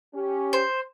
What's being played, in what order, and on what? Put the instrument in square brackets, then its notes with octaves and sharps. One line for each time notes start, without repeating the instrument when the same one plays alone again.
[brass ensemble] C#4 G4
[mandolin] C5